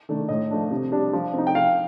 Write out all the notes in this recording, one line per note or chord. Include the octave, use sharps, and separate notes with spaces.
D#3 A3 D4
A2 D#5
F3 A3 D4
C3
G3 D4
F3
C4 D#4
G5
F3 F5